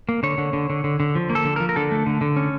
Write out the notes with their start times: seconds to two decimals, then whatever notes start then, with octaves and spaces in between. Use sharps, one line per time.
0.09 A#3
0.23 D3 C#5
0.38 D3
0.53 D3
0.70 D3
0.84 D3
1.00 D3
1.15 F3
1.30 A#3
1.35 A4
1.45 D3
1.56 A#4
1.60 F3
1.69 A#4
1.76 D3 A4
1.91 A3
2.07 D3
2.21 D3
2.36 C#4